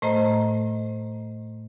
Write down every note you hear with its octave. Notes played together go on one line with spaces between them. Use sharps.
A2 A3 C5 D#5 A#5